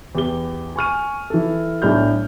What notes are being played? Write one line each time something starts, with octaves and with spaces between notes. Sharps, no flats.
E2 G4 G7
G#5 C#6 F6 D#7
E3 A4
B1 A2 D4 F6 G6